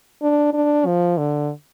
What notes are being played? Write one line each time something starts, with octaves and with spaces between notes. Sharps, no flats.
D4
D4
F3
D3